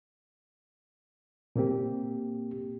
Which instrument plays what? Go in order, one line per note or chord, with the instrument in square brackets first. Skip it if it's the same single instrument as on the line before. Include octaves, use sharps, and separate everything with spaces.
[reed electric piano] A#2 A#3 C4 G4